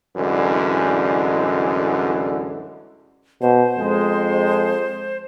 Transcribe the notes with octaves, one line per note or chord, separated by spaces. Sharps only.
C2 F#2 D3 E3 G#3
B2 C5
F2 G#3